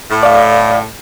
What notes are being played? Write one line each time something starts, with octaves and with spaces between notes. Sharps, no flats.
A2
D5 F5